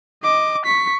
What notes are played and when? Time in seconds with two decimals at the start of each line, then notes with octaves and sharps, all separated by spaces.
0.23 D#5 D6
0.65 C#6 B6